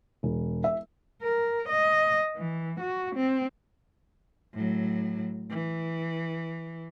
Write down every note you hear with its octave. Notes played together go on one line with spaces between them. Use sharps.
E1
E5
A#4
D#5
E3
F#4
C4
A2 F#3
E3